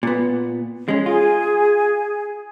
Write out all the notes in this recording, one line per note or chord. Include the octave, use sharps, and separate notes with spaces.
A#2 B3
G#3 C#4
F4 G#4